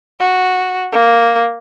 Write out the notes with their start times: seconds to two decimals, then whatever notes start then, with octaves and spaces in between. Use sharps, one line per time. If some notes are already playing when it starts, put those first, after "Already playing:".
0.20 F#4
0.92 A#3